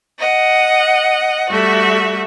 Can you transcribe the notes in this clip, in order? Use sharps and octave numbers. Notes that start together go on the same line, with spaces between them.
D#5 F#5
G3 A3 F#4 E5